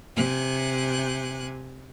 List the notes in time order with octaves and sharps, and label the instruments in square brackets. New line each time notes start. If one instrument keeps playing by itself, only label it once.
[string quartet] C3 G#5 F#6